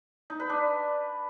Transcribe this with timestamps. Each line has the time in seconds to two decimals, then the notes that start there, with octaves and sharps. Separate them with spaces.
0.30 D#4
0.40 B4
0.49 D4